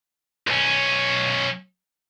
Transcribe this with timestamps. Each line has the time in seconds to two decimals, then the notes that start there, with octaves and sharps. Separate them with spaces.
0.47 B1 C#4